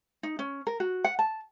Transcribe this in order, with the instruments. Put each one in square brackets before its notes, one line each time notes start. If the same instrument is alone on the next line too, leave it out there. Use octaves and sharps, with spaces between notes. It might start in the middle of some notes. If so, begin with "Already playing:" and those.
[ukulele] D#4
C#4
A#4
F#4
F#5
A5